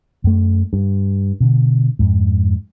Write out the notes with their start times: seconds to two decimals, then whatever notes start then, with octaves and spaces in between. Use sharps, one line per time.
0.24 F#2 A3
0.73 G2
1.40 B2 D3
1.99 F2 G#2